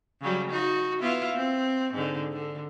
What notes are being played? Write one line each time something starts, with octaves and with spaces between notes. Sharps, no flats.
C#3 F#3 G3
D#4 F#4
B3 E4 F4
C4
G#2 D3
D3